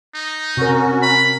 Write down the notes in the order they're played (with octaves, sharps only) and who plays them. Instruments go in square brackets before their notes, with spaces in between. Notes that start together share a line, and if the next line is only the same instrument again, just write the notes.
[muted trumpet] D#4
[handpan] C3 A#4 [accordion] C#4 F#4
[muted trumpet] B5